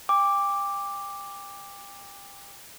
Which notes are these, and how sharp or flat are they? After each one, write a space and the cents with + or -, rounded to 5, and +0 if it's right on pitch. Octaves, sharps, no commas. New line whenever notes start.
G5 +35 D6 +0